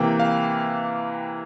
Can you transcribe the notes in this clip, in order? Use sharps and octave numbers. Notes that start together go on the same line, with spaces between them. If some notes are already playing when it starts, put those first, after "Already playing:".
Already playing: C3 E3 A#3 G5
F5